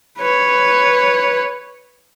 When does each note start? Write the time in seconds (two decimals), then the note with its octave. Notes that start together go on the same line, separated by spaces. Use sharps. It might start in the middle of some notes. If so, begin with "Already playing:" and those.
0.18 B4 C#5